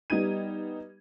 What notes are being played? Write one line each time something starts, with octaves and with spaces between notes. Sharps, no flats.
G3 B3 D#4 G4 G#6 D#7